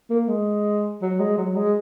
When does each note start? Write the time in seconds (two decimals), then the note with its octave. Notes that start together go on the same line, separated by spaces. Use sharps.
0.10 A#3
0.28 G#3
1.02 F#3
1.20 G#3
1.38 F#3
1.56 G#3